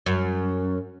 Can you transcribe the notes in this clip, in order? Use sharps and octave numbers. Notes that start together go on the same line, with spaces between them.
F#2